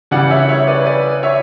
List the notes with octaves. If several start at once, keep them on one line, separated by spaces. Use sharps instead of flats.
C#3 E3 G3 D5 F#5
C#5 E5
C#5 E5
B4 D5
B4 D5
C#5 E5